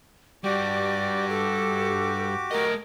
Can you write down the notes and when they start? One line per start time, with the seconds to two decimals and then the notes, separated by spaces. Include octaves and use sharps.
0.44 G2 G3 F#4 G4 D5 D6
1.29 A4
2.51 A3 A#4 D#5